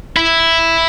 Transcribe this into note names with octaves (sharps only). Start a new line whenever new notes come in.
E4